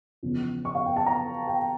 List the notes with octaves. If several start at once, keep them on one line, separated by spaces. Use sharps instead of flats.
E2 C#3 F3
C#6
F5
G5
A5
A#5
G5